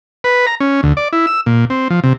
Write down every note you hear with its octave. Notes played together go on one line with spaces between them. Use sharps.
B4
A#5
C#4
D2
D5
E4
E6
A#2
C4
F3
C3